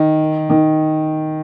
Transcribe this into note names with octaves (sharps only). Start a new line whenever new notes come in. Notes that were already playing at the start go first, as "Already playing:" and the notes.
Already playing: D#3
D#3